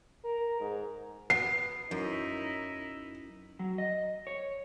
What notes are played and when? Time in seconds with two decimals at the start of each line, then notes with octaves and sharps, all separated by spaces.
0.24 A#4
0.61 G#2
1.30 B3 C7
1.91 F#2 D#4 E4
3.59 F#3
3.78 D#5
4.27 C#5